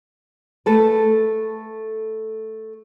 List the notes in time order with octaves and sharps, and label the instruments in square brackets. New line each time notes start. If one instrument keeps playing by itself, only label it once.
[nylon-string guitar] A3 A4 B4